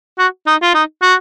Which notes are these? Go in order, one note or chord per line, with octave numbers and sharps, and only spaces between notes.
F#4
D#4
F4
D#4
F#4